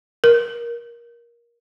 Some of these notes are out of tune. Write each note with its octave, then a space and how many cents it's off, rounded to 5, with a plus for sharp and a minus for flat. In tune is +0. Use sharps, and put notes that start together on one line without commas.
A#4 +15